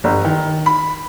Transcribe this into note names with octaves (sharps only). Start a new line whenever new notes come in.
G1
D#3
B5